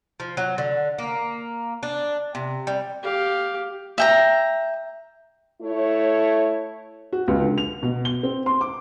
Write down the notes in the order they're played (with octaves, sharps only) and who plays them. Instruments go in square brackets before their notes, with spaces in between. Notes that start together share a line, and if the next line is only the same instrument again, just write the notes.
[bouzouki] F3
F#3
D3
A#3
D4
C3
G3
[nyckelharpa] G4 F5
[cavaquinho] E5 G5 A#5
[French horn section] A3 E4 C#5
[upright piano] F#4
C#2
D3
F7
B2
G7
C4
C6
D6